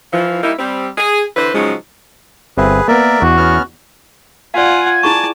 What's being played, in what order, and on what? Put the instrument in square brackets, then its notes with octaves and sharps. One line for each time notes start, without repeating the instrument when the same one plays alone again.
[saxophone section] E3 F3
G3 A#3 D#4 E4
G3 C4
G#4
D3 E3 B4 C5
C#3 F3 F#3 G#3 D#4
[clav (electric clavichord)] G1 C4 E5 [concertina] G#4 B4
[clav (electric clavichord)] A#3 B3 [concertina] A#4 D5 E5
[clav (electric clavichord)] E2 [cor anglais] F#4
[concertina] B3 C#4 F6
[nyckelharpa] F4 F#5 [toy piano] D5 F5 [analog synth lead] G#5
[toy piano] E4 G#4 C#6 [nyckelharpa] D5 A5